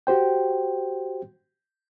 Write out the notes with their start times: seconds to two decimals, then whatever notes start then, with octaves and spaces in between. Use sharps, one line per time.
0.07 F#4 G4 C5 G5